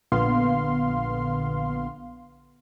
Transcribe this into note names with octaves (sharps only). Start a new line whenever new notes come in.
A#1 A#2 D3 B3 F5 C6